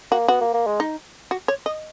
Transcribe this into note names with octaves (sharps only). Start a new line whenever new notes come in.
A#3 F#4
B3 F#4
A#3
A#3
G#3
D#4
F#4
C#5
D#5